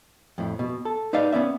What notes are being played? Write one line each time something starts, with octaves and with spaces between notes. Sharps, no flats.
F2 A2
B2
A4
D#4 B4 D5 F5
B3 C#4 D5 E5